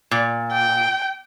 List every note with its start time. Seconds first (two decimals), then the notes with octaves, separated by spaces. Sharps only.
0.11 A#2
0.52 G5